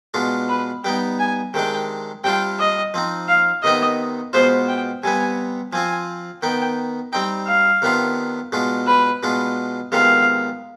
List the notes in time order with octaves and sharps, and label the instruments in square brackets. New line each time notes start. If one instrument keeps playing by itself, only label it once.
[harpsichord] B2 G#3 D4 F4
[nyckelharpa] B4
[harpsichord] G3 B3 D#4 [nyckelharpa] G5
[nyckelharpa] G#5
[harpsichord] C3 D#3 G#3 D4 [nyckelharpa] G5
[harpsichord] C3 G3 D4 F4 [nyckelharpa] G5
[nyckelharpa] D#5
[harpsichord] F3 C4 D#4
[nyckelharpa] F5
[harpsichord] C3 D#3 B3 D#4 [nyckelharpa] D#5
[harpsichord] B2 G#3 B3 F4 [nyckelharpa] C5
[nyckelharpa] G5
[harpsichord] C3 G3 B3 [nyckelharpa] G#5
[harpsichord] F3 C4 F4 [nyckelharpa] G#5
[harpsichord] D#3 B3 D#4 [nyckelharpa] G5
[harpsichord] G3 C4 D#4 [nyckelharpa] G5
[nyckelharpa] F5
[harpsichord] C3 D#3 B3 D4 F4
B2 G#3 D4 F4
[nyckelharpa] B4
[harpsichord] B2 G#3 D4 F4
[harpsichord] C3 D#3 G#3 B3 F4 [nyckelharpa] F5